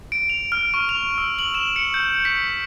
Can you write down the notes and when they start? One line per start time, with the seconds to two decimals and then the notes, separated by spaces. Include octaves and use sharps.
0.12 D7
0.30 F7
0.52 F6
0.74 C#6
0.89 F7
1.18 E6
1.39 F#7
1.55 E7
1.76 C#7
1.94 G6
2.25 B6